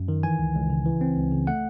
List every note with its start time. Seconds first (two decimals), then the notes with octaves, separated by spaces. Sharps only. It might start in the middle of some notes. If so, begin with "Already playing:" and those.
Already playing: F#2
0.08 D#3
0.23 E3 G#5
0.39 C#2
0.55 C#2
0.70 C#3
0.85 E3
1.01 C4
1.17 C#2
1.32 C#3
1.47 A3 F#5